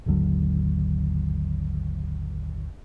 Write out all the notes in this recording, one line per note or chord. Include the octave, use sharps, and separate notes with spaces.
G#1 D#2 D3 F#3